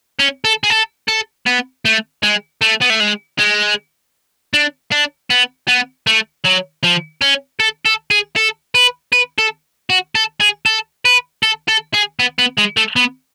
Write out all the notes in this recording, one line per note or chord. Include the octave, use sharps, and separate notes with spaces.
C#4
A4
G#4
A4
A4
B3
A3
G#3
A3
B3
A3
G#3
G#3
D4
D4
B3
B3
A3
F#3
F3
C#4
A4
A4
G#4
A4
B4
B4
A4
F#4
A4
G#4
A4
B4
A4
A4
G#4
B3
B3
G#3
A3
B3